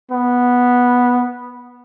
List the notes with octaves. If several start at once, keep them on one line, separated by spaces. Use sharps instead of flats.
B3